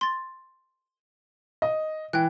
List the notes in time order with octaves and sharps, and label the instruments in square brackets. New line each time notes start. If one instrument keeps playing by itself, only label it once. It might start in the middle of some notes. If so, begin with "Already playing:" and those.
[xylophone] C6 A6
[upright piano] D#5
[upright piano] E3 [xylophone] G5 F#6